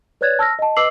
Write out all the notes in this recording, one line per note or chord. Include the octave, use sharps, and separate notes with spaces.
B4 C#5 D5 F#6 G#6 A6
A5 E6 F6 A#6
D#5 A5
B4 D#5 D6 E6 C7 F#7